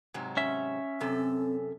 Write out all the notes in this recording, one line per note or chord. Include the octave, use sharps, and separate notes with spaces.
G#2 C3 F#3
C#4 E5
F#2 C3 C4 A4